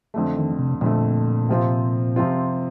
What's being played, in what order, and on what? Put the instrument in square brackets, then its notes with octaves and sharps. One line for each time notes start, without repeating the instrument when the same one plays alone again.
[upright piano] F2 D3 A3
[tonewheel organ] D#3
C3
[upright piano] F2 D3 A3 [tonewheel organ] A#2
[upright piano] C3 F3 C4 F4
C3 F3 C4 F4